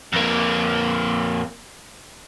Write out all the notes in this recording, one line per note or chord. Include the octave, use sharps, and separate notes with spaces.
F2 A#3